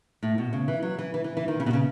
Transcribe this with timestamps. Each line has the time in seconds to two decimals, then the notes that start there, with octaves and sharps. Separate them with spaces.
0.23 A2
0.38 B2
0.53 C#3
0.68 E3
0.83 F#3
0.98 E3
1.14 E3
1.24 E3
1.37 E3
1.48 D#3
1.60 C#3
1.66 B2
1.73 C#3